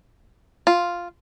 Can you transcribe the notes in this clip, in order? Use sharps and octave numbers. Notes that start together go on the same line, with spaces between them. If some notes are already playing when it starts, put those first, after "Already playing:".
F4